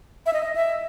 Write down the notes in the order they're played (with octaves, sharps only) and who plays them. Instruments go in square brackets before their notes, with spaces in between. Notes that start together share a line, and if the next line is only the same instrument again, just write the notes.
[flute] E5
D#5
E5